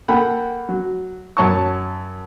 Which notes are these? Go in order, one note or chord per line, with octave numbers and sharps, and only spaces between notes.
A#3 A4 F#5 G5 B5
F#3
F#2 C#5 A5 A#5 C#6